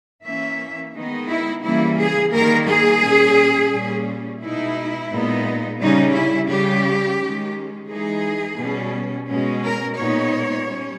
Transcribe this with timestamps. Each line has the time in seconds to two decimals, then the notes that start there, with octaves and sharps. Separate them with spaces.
0.24 E3 A#3 C#4 E5
0.94 D#3 G#3 B3 D#4
1.29 E4
1.63 C#3 E3 G3 A#3 E4
1.99 G#4
2.33 D#3 G3 A#3 A#4
2.67 G#4
3.03 A#2 G3 C#4
3.72 A#2 G3 C#4
4.42 B2 G#3 D#4 E4
5.11 A#2 G#3 B3 D#4
5.80 C#3 G3 C#4 D#4
6.15 E4
6.50 C#3 G3 C#4 G4
7.19 D#3 G#3 C#4
7.89 E3 G#3 D#4 G#4
8.58 B2 G3 C#4
9.27 B2 G#3 C#4
9.63 A#4
9.97 A#2 G#3 B3 D#4 C#5
10.66 G3 C#4